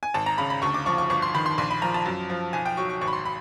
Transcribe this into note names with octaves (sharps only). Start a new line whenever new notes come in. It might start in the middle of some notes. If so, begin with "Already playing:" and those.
G#5
G#1 A5
A#5
C#3 B5
B5
D2 C#6
D6
F3 C#6
C#6
G1 C#6
C6
D#3 B5
C6
A#1 C6
B5
F3 A#5
A5
F#2
F3
B1 G#5
G5
F#3 C#6
C#6
G#1 C#6
B5
C6
B5